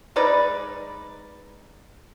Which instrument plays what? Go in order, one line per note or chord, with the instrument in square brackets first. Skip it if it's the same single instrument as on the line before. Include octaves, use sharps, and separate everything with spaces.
[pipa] G#3 D#4 B4 D5